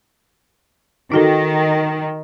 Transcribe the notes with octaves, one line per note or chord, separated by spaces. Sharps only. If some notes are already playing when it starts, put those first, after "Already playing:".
D#3 D#4 F#4 A4